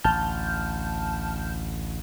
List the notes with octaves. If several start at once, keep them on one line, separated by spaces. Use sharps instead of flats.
A1 D2 A5 F6 G6